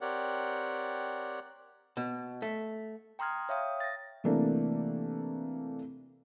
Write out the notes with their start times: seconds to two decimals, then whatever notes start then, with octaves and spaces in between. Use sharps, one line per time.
0.01 C4 G4 A#4 C#5 D5 F#5
1.97 B2
2.42 A3
3.19 G5 A#5 C6 D#6 F6 G#6
3.49 C#5 E5 F5 G5 D#6
3.80 A6 A#6
4.24 C3 E3 A3 A#3 D4